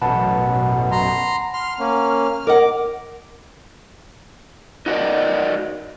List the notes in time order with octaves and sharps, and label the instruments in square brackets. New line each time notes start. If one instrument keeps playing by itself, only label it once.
[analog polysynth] A1 F#2 B2 [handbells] F#5 A5 B5
[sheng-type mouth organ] A#5 C6
[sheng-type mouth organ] C6 [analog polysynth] F6
[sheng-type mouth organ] A#3 C#4
[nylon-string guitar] A#4 D#5 F#5 [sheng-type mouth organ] D6
[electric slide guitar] D#4 F#4 A#4 D5 D#5